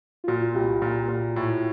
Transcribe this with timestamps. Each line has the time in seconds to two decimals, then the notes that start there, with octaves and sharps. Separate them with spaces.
0.24 F4
0.27 A#2 F#4
0.41 F4
0.54 C2 G4
0.69 F#4
0.82 A#2 G4
1.08 A#2
1.36 A2